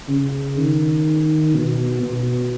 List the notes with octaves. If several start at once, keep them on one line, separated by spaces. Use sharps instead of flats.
C#3
D#3
B2
B2